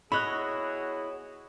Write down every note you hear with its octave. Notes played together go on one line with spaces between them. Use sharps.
B3 E4 F#4 G#4 C#5 D#5 B5 F#6